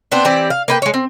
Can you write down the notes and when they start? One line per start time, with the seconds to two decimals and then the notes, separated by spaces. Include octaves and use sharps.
0.12 B3 C4 D4 C5
0.25 E3 C4 G4 D5
0.50 F5
0.68 A#3 B4 G5
0.82 G#3 C#5
0.94 C4